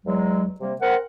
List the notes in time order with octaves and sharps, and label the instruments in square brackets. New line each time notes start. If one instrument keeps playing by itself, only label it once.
[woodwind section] E2 F#3 G#3
C3 G3 A#3
C4 A#4 F#5